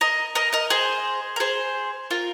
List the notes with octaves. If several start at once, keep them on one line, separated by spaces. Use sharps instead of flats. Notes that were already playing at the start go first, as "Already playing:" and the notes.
A#4 D#5
A#4 D#5
A#4 D#5
G#4 C5
A#4
G#4 C5
F4 A#4